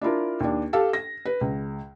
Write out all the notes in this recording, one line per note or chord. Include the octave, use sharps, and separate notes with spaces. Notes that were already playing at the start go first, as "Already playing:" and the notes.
D4 E4 F4 A#4
D#2 D4
G4 A4 F5
A#6
B4
C#2